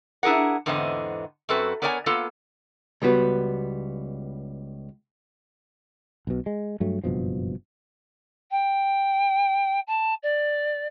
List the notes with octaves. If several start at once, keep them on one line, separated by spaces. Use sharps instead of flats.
D4 E4 G#4 A#4 F#5
E2 G#2 D3 B3 C4 D#5
F#2 C4 F#4 A4 B4
B3 A#4 C#5 D5 E5 G#5
A#3 B3 F4 A4
C#2 G3 B3 F#4 B4
B1 B2
G#3
G2 F#3 A3
F#1 G2 B2 F3
G5
A5
D5